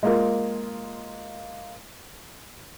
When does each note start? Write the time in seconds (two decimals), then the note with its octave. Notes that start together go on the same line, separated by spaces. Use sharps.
0.03 G#3 A#3 F4